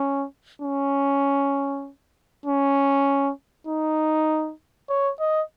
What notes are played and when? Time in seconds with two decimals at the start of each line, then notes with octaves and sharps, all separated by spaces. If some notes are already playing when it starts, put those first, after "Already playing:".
Already playing: C#4
0.62 C#4
2.46 C#4
3.67 D#4
4.89 C#5
5.20 D#5